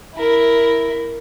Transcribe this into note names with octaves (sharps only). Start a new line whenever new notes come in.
E4 A#4